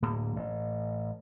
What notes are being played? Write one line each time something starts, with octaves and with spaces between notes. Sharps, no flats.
D1 A2 A#3
A1